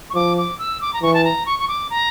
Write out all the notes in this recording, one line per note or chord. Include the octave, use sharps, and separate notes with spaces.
C#6
F3 D6
D6
E6
D6
A#5
E3 C#6
A5
A#5
C#6
C#6
D6
A#5